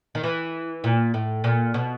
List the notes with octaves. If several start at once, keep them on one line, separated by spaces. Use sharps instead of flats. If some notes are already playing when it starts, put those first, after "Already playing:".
D#3
E3
A#2
A2
A#2
B2